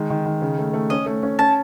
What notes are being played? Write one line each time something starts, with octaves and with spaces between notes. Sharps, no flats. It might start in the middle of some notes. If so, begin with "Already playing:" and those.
Already playing: D#3 G#3
D#3
D#3
C#3
A3
A3
C#4 D#5
A3
C#4
C#4 A5